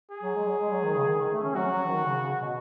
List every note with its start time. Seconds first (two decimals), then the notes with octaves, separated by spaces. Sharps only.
0.11 G#4
0.23 F#3
0.35 G#3
0.47 F#3
0.59 G#3
0.71 F#3
0.84 D#3
0.96 C#3
1.07 D#3
1.20 D#3
1.32 A3
1.43 C#4
1.56 F#3 F#4
1.72 F#3
1.88 D#3
2.05 C#3
2.16 C#3
2.41 B2